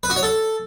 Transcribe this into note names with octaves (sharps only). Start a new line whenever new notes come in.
B4
F#4
C#5
A4